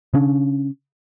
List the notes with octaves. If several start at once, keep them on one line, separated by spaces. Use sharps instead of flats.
C#3 C#4 D4